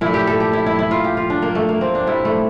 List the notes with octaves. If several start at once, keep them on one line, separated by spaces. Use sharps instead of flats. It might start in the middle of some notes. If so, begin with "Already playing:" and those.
A#2 A3 E4
G4
A4
G4
E4
E4
E4
F4
G4
F4
D4
A#3
A3
A#3
C4
D4
A#2 G3 E4
A3